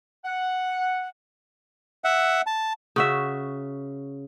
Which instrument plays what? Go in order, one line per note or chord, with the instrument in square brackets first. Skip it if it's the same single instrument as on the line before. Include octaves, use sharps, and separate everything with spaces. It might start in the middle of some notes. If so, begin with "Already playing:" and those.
[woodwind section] F#5
[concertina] E5 F#5
A5
[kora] C#3 F#4 E5